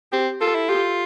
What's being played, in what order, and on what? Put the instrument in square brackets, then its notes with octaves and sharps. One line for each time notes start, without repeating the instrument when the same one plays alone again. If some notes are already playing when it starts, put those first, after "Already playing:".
[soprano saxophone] C4 [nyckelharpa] G4
[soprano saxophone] F4 [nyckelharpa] A4
[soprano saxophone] E4
[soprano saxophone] F4 [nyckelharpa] G4